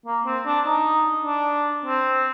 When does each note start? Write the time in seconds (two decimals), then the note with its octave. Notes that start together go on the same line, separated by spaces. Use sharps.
0.06 A#3
0.26 C4
0.46 D4
0.66 D#4
1.25 D4
1.85 C4